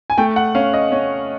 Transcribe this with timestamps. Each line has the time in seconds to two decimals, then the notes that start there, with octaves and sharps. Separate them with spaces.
0.10 G#5
0.18 A3 G5
0.36 F#5
0.55 C#4 F5
0.74 D#5
0.92 C#4